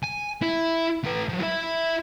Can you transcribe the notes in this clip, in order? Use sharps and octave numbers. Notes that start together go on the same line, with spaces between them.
G#5
E4
A3 B4
F3 F#3
E4 E5